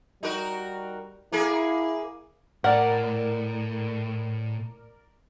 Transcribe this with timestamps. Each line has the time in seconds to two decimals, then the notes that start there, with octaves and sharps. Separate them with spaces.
0.23 G3 D#4 F#4 A#4
1.32 A#3 E4 G#4
2.64 A2 A#4 D5 F#5